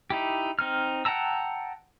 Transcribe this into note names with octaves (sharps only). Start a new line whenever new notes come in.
D#4 E4 G4
C4 D#4 F6
F#5 G5 A5 A#5 E6